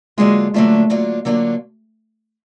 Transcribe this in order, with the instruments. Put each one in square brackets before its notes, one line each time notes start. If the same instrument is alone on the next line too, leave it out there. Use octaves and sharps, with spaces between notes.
[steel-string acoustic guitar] D3 F#3 A#3 D4 F4 [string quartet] G#3
[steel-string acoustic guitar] D3 F#3 A#3 D4 F4 [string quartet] A3
[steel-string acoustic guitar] D3 F#3 A#3 D4 F4
D3 F#3 A#3 D4 F4